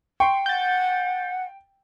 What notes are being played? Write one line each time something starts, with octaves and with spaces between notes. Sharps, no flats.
G5 C6 C#6
F#5 G6 A6